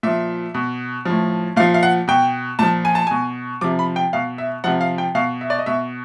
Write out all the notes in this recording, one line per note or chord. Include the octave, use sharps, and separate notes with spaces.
A#2 F3 E5
B2
A2 F3
A#2 F3 F5
F5
F#5
B2 G5
A#2 F3 A5
G#5
A5
B2 G#5
C3 F3 D6
B5
G5
B2 F5
E5
C3 F3 F#5
F5
G5
B2 F5
E5
D5
D#5
B2 E5